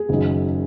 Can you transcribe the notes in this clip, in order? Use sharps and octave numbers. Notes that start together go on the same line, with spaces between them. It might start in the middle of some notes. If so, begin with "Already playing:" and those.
Already playing: G#4
F#1 D#3 F#3